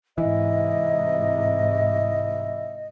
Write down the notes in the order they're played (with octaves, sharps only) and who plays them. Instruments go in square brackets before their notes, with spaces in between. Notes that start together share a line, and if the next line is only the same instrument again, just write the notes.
[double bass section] G#2 C3 [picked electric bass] E3 [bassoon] E4 [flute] D#5